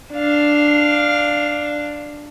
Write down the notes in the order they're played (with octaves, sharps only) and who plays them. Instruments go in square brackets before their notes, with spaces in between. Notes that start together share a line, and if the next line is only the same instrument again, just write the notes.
[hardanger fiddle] D4 F5